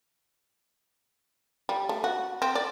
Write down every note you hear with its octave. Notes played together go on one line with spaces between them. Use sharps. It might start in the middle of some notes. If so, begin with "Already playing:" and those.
G3
A3
F#4
C4
D5